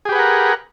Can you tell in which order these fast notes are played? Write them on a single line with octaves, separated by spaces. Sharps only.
G#4 G4 B4 F#5 A#4